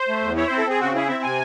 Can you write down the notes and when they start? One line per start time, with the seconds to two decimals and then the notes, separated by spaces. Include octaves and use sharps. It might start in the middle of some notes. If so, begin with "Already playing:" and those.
Already playing: C5
0.08 A3
0.22 E2
0.36 E4 C#5
0.47 C4 C5
0.58 A4
0.66 C4 G#4
0.80 C#3 F#4
0.95 E4 G#4
1.09 C4 E5
1.23 C3 G#5